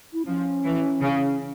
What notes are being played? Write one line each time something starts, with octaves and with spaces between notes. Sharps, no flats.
E4
F3 C#4
E3
C#3